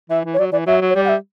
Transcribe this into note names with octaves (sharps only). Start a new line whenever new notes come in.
E3 E5
E3
C#5
F#3 D5
E3 D5
F#3 E5
F#3
C#5
G3 D5
F#5
E5